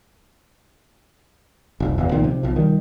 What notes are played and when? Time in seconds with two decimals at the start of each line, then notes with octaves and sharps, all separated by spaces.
1.80 F1 C2 F2
1.98 E1 A1 E2
2.11 B1 A#2 D#3 F3
2.24 C3
2.43 B1 F3
2.56 D#3 G3